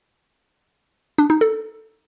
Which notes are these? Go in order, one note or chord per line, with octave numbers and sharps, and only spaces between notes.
D4
D#4
A4